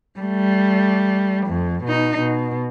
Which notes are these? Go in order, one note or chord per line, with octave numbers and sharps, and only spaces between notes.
G3 A3
F2
B2 D#4
B2